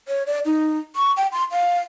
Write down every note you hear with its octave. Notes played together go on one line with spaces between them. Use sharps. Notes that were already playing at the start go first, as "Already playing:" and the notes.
C#5
D5
D#4
C#6
G5
C6
F5